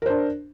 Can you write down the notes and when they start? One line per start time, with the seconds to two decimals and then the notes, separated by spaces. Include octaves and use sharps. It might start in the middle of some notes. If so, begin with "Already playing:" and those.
0.02 A#4
0.06 C5
0.10 D4